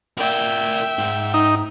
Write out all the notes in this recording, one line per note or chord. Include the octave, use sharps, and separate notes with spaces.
A#4 D5 E5 G5
G#2
D#4